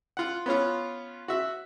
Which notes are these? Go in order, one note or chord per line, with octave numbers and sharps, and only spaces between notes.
F4 F#5
B3 C#4 F4
F#4 E5